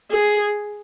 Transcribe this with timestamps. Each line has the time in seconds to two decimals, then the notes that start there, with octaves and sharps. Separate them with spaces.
0.11 G#4